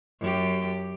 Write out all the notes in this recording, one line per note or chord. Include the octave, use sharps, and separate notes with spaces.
F#2 G4